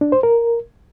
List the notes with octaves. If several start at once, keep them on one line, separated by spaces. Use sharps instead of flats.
D4
C5
A#4